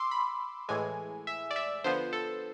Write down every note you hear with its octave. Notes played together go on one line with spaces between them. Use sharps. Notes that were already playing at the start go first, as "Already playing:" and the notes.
Already playing: C6 D6 E6
B5
A2 E3 G#3 G#5
E5
D5
E5
D3 F3 B3 C5
A4